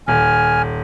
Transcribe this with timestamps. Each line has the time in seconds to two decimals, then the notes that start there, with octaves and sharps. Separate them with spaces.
0.08 D#1 G#5 F6